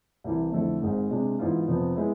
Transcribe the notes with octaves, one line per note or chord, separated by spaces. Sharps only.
C2 C3 E3
F2 D3 A3 E4 A4
G#1 G#2 G#3
C3 G#3 D4
G#2 E3 B3 F4
F1 F2 C3 F3 B3
G#3 B3 E4